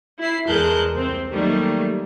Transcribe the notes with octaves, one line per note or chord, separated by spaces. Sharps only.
E4 C7
E2 G#3 A#4 A5 F#6 G6
C2 C3 C4
D#3 F#3 G3 A3 A#3